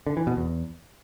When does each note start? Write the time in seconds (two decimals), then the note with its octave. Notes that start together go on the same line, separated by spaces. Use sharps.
0.07 D3
0.17 E3
0.27 B2
0.37 E2